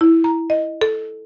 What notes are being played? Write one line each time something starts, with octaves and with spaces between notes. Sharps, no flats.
E4
A#5
D#5
A4